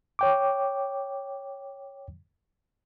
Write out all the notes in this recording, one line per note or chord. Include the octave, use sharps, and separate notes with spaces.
C#5 G5 D6